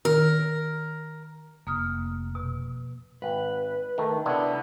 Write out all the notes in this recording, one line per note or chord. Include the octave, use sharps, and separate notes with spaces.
D#3 A#4
F1 A#3 D#6 F6
B2
G#1 B4
D#3 A3
C3 B3 D4 E4 F#5